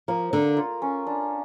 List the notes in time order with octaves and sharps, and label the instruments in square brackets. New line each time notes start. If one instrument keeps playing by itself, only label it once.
[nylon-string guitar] F3 [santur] A#3
[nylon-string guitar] D3 [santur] A#4
[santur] F4
C#4
D4